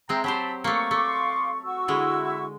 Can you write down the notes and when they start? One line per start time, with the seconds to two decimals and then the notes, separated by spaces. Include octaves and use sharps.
0.09 G#3 C4 E5 G5 A#5
0.24 F#3 G4 C5 A5 B5
0.64 A3 A#3 C#6
0.91 A3 F5 C6 D6
1.63 F#4 C#6 E6
1.88 D3 G#3 E4